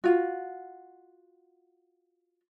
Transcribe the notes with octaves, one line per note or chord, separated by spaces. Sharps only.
F4 F#4